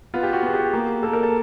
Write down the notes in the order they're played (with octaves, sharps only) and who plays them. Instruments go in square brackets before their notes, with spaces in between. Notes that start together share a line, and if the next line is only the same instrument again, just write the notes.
[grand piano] B3 F4
G4
F#4
B3 G#4
G4
A#3 G#4
A#3 A4
A#4
A4